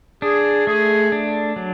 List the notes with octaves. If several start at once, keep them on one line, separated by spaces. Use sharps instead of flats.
D4 G#4
A3 G#4
D4
F#3